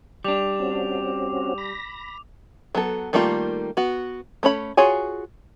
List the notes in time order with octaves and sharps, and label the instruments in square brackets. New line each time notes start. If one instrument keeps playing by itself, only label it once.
[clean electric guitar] G3 D4 [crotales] D6 F7
[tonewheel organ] C4 C#4 F#4
B5 A#6
[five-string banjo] F#3 B3 A4
D#3 G3 A3 A#3 F4
B3 F#4
A3 C#4 C#5 B5
F4 F#4 G#4 C#5 G#5